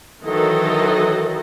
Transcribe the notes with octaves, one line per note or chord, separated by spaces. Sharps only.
D#3 E3 F#3 A4 D#5